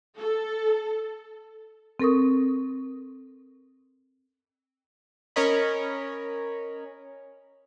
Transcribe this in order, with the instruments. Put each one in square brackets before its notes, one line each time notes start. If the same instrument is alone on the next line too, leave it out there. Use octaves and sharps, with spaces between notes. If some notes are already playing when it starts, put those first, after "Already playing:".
[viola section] A4
[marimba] C4 A4 A#4 C#6 D#6
[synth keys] C#4 A#4 C#5 D#5 B5